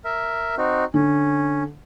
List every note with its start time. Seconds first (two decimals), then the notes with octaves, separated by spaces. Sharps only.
0.05 A#4 E5
0.58 C4 D#4 F#4
0.94 D3 C#4